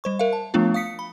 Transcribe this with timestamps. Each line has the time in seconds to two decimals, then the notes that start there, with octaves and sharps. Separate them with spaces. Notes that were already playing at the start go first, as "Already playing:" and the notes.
0.04 G3 C5 C#6
0.19 A#4 E5 F5
0.33 A5
0.54 F3 A3 B3 D4 F4
0.74 F5 D#6 B6 C#7
0.99 B5